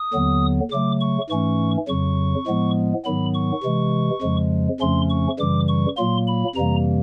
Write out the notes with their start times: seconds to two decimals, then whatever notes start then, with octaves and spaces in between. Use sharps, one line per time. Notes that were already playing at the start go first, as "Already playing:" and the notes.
Already playing: D#6
0.13 D#2 D3 F#3 B3
0.71 C#3 F#3 A3 D6
1.01 C#6
1.30 G#2 E3 A3 C#4 C#6
1.88 F2 C#3 F#3 C#6
2.47 A2 F3 G#3 B3
3.05 G#2 D#3 F#3 B3 B5
3.34 C#6
3.64 C3 E3 G#3
4.22 F2 C#3 F3 G#3
4.80 F2 C#3 F3 A3 C#4 C6
5.10 C#6
5.39 F#2 C#3 E3 G3 D6
5.68 C#6
5.97 A#2 F#3 A#3 C6
6.27 B5
6.55 F2 C3 E3 G3 A#3 A#5